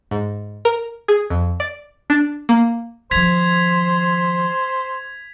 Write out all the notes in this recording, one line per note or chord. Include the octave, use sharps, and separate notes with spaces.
G#2
A#4
G#4
F2
D5
D4
A#3
D#3 F3 C5 G#6 B6 F7